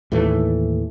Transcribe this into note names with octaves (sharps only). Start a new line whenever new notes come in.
D#2 A2 E3 A3